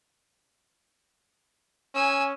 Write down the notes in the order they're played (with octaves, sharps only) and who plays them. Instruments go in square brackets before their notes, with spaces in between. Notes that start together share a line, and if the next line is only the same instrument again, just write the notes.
[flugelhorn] C#4 [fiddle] G#5 E6